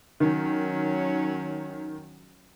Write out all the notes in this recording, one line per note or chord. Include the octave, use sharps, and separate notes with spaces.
D#3 F#3 C#4